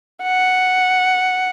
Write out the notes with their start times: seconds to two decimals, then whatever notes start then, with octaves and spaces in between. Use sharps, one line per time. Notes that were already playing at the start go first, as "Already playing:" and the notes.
0.23 F#5